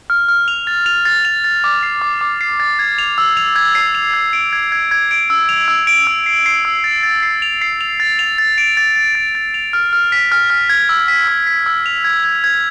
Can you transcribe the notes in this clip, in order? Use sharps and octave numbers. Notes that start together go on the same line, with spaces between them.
F6
F6
F7
A6
F7
A6
F7
A6
D6
C7
D6
D6
C7
A6
G#6
F7
E6
F7
G#6
C7
F7
G#6
D7
G#6
G#6
G#6
D7
E6
F7
E6
D7
E6
C7
C7
E6
A6
A6
C7
F7
C7
F7
A6
F7
A6
D7
A6
A6
A6
A6
F7
F6
F6
B6
F6
F6
G#6
E6
B6
E6
B6
E6
F7
G#6
G#6
G#6